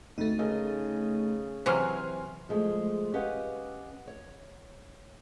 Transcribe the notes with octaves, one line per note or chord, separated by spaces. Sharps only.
D2 A3 D#4
C#3 A4 A#4 D#5
C3 E3 F#3 C5 G#5 C6 F6
F3 G#3 A3
C#4 G4 B4 D#5 F5 F#5
C#5